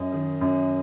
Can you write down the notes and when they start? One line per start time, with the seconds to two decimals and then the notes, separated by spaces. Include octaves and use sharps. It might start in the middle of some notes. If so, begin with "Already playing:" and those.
Already playing: F#2 D#5
0.12 D#3
0.41 F#2